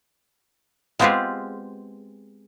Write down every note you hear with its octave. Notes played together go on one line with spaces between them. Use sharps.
G#3 B3 C4 F4 G4 G#4